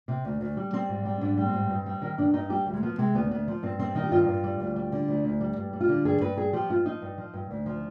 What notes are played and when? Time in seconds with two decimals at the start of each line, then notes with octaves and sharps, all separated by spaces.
0.08 C3
0.25 D2
0.41 D2
0.57 G3
0.73 G3 C4
0.89 G#2
1.05 G3
1.21 G#2 D4
1.37 G3
1.46 C4
1.53 G#2
1.70 G2
1.86 G3
2.02 D#3
2.18 G2 D4
2.34 G2 D#4
2.50 G3 G4
2.66 D2
2.73 G#3
2.83 F3 B3
2.98 C3 G#3
3.15 D2 B3
3.31 D2 B3
3.48 F3
3.63 G2 C4
3.79 G3 C4
3.95 D#3 D#4
4.04 G4
4.12 G2 F4
4.28 G2
4.44 G3
4.60 D2
4.76 G3
4.92 D3
5.08 D2
5.25 D2
5.41 G3
5.57 G2
5.73 G3
5.80 F4
5.89 D3
6.05 G2 G#4
6.21 G2 B4
6.37 G3 G#4
6.53 F3 G4
6.70 G2 F4
6.85 F3 D#4
7.02 G2
7.18 F3
7.34 G2
7.51 D2
7.66 F3